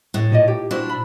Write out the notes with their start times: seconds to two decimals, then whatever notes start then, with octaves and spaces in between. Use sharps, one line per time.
0.14 A2
0.32 A#2 D#4 D5 D#5
0.48 G4
0.71 D4 E4 F#4 C5
0.89 B5